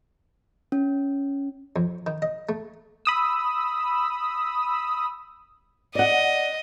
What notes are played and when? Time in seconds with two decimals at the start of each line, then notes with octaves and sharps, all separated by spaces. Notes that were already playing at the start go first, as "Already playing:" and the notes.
0.72 C#4
1.76 F2
2.07 D#3
2.22 D#5
2.49 A3
3.05 B5 D#6 E6
5.95 D5 D#5 F#5